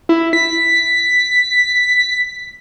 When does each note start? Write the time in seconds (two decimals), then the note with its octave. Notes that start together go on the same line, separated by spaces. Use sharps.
0.09 E4
0.33 B6